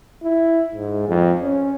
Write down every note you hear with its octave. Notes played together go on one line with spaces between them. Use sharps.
E4
G#2
F2
C#4